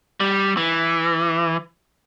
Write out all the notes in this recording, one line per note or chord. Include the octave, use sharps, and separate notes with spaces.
G3
E3